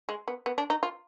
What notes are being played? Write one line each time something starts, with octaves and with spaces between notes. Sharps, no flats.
G#3
B3
B3
D4
D#4
F4